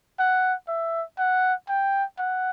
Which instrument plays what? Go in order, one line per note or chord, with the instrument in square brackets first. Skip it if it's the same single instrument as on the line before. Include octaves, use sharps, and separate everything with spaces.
[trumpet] F#5
E5
F#5
G5
F#5